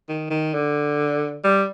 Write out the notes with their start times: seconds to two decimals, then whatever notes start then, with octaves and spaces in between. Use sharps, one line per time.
0.09 D#3
0.30 D#3
0.54 D3
1.44 G3